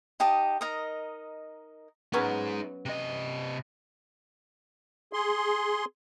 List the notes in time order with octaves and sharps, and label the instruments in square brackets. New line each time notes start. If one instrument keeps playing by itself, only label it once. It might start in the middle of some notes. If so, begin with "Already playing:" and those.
[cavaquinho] D#4 G4 A5 D#6
D#4 A#4 D#5
[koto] F#3 B3 C#4 [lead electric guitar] D#4 G#4
[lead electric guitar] C3 D#5
[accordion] G#4 C6